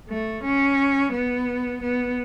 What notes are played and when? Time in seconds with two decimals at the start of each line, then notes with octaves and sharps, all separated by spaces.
0.10 A3
0.44 C#4
1.13 B3
1.82 B3